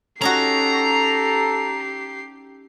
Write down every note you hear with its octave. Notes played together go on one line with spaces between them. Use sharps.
C#4 D#4 F#4 G4 A4 A#5 C7